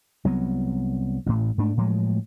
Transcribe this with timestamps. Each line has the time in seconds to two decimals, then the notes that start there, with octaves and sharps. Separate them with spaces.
0.25 C2 F#3 B3
1.26 A1 A2
1.58 G#2 A3 D4
1.77 A2 F3 F#3 G#3